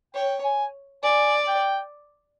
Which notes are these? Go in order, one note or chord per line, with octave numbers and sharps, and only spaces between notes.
C#5 G5
G#5
D5 G#5
G5